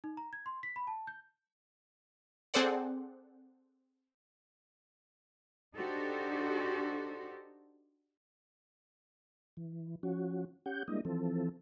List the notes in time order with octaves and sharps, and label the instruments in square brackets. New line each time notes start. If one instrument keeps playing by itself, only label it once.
[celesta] D#4
A#5
G#6
C6
B6
B5
A5
G6
[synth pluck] C4 G#4 A4 C5 D5 F#5
[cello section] D4 D#4 F#4 G4 A4 C5
[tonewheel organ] E3
F3 C#4 F#4
C#4 G4 F#5 G6
G3 G#3 A#3 D4 E4 D#5
E3 F3 C4 A4